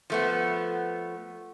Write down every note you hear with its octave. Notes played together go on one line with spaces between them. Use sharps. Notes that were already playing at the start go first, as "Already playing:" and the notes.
F3 A3 B3